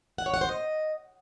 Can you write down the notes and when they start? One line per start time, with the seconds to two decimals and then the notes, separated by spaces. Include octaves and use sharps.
0.18 F#5
0.26 C#5
0.34 F#5
0.41 C5
0.49 D#5